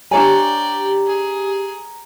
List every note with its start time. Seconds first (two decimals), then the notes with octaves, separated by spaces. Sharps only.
0.11 D4 G4 C#5 D5 G5 G#5 A#5
1.06 G#4